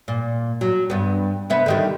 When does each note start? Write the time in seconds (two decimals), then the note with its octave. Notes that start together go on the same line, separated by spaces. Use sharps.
0.08 A#2
0.61 F#3
0.90 G2 B3
1.50 C3 B3 E5
1.66 D3 D#3 G3